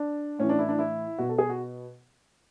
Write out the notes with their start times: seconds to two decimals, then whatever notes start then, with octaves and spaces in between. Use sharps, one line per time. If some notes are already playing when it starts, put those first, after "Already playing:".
Already playing: D4
0.39 A2 E3 C#4
0.49 D4
0.59 E4
0.69 D4
0.79 E4
1.18 B2 F#4
1.29 A4
1.38 G#4
1.49 F#4